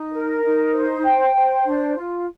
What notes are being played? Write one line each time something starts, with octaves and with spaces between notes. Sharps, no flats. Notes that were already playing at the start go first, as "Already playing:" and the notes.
Already playing: D#4
A#4
D#4
C5
G5
C5
D4
F4